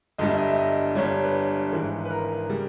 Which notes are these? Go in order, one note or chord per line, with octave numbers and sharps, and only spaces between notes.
G1 G2 G3 D#5
E5
D#5
E5
D#5
G1 G2 G3 C#5
C#5
B4
G#1 G#2 E3 G#3
B4
A#4
C#3 G3